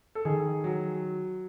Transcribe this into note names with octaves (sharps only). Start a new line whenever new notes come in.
A4
D#3 G#4
F#3